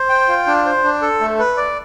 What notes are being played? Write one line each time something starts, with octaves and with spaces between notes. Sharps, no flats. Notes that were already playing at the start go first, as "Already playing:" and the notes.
Already playing: C5
G5
F4
D4
C5
D4
A4
A3
B4
D5